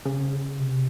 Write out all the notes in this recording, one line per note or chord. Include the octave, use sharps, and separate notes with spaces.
C#3
C3